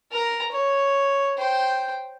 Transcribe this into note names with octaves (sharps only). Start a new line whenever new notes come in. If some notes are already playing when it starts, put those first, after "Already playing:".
A#4 A#5
C#5
C5 G5